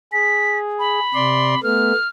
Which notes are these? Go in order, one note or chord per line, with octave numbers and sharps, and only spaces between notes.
G#4 B6
B5
C3 D5 C6
A3 B3 F6